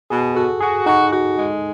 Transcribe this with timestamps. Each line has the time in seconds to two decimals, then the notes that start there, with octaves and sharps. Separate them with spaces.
0.10 B2 G#4
0.35 F#4 A4
0.60 F#4 G#4
0.86 D#4 F#4
1.12 F#4
1.37 G#3